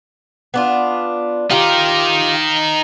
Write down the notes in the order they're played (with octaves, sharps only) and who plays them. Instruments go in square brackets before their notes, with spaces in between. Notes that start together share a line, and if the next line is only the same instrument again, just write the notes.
[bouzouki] B3 D4 F4
[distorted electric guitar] D#4 A#4 [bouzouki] F4 G4